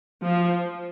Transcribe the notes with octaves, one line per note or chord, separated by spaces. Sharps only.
F3